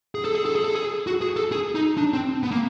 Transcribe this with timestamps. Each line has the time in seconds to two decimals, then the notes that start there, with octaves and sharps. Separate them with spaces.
0.15 G#4
0.25 A4
0.35 G#4
0.45 A4
0.55 G#4
0.64 A4
0.75 G#4
1.07 F#4
1.21 G#4
1.36 A4
1.52 G#4
1.75 D#4
1.98 D4
2.13 C4
2.43 B3
2.51 A#3